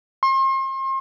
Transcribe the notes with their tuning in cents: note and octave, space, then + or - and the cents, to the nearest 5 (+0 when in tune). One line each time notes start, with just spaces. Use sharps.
C6 +40